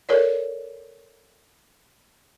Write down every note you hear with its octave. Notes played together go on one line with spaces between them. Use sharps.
A4 A#4 C#5 D5